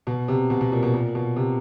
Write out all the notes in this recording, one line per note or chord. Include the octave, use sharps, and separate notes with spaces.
B2
C3
B2
B2
A#2
B2
A#2
B2
C3